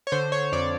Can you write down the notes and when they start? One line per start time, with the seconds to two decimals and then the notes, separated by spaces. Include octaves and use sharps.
0.07 C#5
0.12 D3 C5
0.32 C#5
0.52 F2 D5